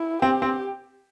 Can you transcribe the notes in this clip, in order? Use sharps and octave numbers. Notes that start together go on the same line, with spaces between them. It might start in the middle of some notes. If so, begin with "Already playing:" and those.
Already playing: E4
C4 G4
C4